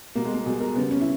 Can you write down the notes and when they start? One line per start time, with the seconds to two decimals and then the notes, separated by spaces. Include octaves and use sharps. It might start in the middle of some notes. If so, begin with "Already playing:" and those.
0.15 B2 G3 A#3
0.25 G#3
0.35 A#3
0.46 B2 G3 G#4
0.61 A#4
0.75 C#3 G3 B3
0.91 C#4
1.01 E4